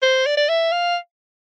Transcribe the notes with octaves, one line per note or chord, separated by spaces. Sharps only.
C5
D5
D5
E5
F5